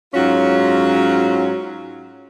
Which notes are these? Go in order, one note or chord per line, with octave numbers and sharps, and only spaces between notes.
G#2 F#3 C#4 F4 F#4